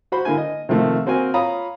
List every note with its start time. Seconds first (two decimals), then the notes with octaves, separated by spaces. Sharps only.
0.12 F#4 C5 B5
0.25 D3 A#3 E4 G#5
0.38 D#5
0.69 C3 D#3 F3 A3 A#3
1.06 A#3 C4 F#4 A#4 G#5
1.34 F4 C#5 F5 A#5 B5 D#6